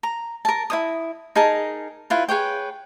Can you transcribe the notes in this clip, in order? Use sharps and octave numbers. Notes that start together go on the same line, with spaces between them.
A#5
A#4 A5
E4 C#5 D#6
D#4 G#4 A#4 A5
E4 F4 B4
G#4 B4 C#5 G5